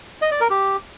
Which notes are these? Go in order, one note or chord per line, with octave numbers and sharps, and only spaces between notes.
D#5
D5
A#4
G4